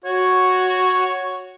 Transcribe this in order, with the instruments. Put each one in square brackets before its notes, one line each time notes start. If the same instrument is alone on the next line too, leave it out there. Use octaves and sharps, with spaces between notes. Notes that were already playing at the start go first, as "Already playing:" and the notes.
[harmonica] F#4 [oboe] C#5